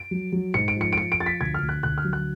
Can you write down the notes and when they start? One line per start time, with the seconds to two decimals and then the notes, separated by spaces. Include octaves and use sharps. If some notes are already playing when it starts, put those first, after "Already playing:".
Already playing: D7
0.11 F#3
0.32 F#3
0.54 G#2 C#7
0.68 D7
0.76 F3 C#7
0.93 D7
0.97 F3 C#7
1.12 D7
1.19 F3 A6
1.26 B6
1.41 D2 G#6
1.54 F6
1.62 D2
1.69 F#6
1.83 D2 F#6
1.98 F6
2.04 F#3
2.13 F#6